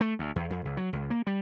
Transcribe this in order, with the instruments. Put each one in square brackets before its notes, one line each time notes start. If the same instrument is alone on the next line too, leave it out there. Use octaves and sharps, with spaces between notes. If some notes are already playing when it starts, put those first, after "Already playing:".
[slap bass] A3
D2
E2
F2
C#2
F#3
C#2
A#3
G3